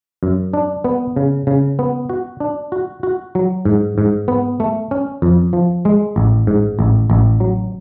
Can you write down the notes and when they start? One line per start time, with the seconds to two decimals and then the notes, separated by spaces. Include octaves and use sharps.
0.23 F#2
0.53 D4
0.84 B3
1.16 C#3
1.47 C#3
1.79 B3
2.10 F#4
2.40 D4
2.72 F#4
3.03 F#4
3.35 F#3
3.65 G#2
3.98 G#2
4.28 B3
4.60 A3
4.91 C#4
5.22 F2
5.53 F3
5.85 G#3
6.16 A1
6.47 G#2
6.79 A1
7.10 A1
7.40 F#3